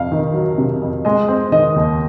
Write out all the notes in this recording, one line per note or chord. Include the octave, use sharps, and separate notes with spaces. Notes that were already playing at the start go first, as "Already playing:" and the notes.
Already playing: F2 C3 F5
D#3
F#3
C3
F2
G#3 D#5
C4
D#3 D#5
D#2